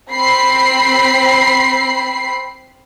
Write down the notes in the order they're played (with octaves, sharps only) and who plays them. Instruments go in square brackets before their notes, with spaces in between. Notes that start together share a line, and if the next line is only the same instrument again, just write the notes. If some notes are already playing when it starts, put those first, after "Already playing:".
[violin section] C4 B5 C7